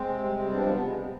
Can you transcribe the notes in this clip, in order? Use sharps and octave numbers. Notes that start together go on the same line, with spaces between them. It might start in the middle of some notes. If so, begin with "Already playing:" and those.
Already playing: G#3 C4
C3
G3
G3
F3 B3 D4
C3 B3
C3 G#3
C3